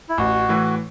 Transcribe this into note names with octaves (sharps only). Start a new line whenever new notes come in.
E4
A1 F#4
A2 E3